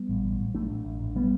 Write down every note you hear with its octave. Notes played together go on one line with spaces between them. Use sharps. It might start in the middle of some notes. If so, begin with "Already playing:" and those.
Already playing: G3 B3
A1
A1
A1
A1 A3 D4
A1
A1
A1
G3 B3